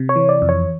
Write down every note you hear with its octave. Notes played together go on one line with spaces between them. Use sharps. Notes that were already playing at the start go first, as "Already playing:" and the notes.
Already playing: C3
C#5
E3
D5
F2
C#5